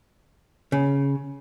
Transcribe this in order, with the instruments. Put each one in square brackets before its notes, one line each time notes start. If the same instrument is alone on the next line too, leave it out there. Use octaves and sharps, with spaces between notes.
[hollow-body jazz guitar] C#3